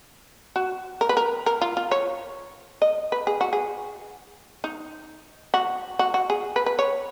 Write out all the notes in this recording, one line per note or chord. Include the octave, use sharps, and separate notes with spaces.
F#4
A#4
B4
A#4
A#4
F4
F4
C#5
D#5
B4
G#4
F#4
G#4
D#4
F#4
F#4
F#4
G#4
B4
B4
C#5